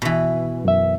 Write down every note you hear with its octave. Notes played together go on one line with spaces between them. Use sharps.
B2 E3
F#2 E5